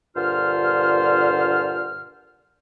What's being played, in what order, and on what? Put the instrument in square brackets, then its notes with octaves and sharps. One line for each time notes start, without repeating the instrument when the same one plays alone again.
[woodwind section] G2 A#2 D3 F4 C5 F6